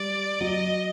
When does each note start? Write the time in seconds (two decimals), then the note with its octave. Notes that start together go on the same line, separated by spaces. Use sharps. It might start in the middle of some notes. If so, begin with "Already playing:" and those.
Already playing: G3 D5
0.40 F#3 D#5